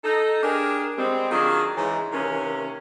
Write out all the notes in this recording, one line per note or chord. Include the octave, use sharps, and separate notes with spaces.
D#4 A4
D4 G4 G#4 A#4
G3 G#3 C4
D#3 F#3 G3 D4 F4 G#4
G#2 C#3 E3
C3 D#3 E3 A#3 C#4